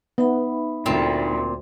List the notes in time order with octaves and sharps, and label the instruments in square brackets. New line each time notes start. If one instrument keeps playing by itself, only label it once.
[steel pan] B3 [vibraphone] D#4 E5 B5
[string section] D2 [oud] A#2 C4